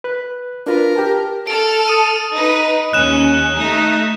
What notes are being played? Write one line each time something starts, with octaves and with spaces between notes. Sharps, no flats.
B4 F#6
D4 F4 A#4 B4
G4 G5 A5
A4 F6 D7
D#6 D#7
D#4 B4
D#2 C#4 F#6 E7
A3 D#4